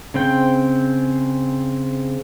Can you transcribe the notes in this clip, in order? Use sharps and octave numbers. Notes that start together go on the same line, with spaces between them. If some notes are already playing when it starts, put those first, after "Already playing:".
C#3 C4 G5